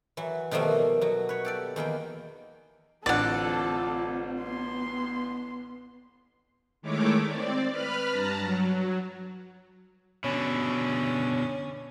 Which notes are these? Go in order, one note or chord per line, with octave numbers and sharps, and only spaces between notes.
E3 F#3
B2 D#3 F3 G3 A3 A#3
B2 F#3
B4 C#5
G4 A4 D5
E2 D#3 A#3 G5
A1 D3 C4 F4 A4 D5 F#5
B3 C6
D#3 G#3 A3 E4 C#5 D6
C4 D5
B4 B5 F6
G2 A5 A#5
F#3
B2 D3 C#4